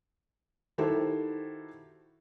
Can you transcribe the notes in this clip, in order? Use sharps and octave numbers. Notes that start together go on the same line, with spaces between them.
D#3 E4 F#4 G4 A4 C5